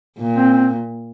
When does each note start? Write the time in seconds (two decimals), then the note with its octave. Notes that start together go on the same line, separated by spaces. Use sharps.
0.18 A#2
0.36 C4
0.53 C4